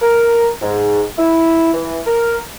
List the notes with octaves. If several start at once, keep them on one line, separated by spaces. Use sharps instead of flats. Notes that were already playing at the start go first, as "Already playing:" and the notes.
A#4
G#2
E4
E3
A#4